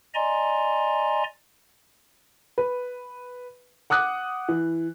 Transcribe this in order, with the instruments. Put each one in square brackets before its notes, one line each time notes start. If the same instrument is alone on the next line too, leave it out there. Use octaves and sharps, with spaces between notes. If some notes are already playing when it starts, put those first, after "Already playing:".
[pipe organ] D5 D#5 G#5 A#5 C6
[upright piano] B4
F#5 D6 D#6 F#6
E3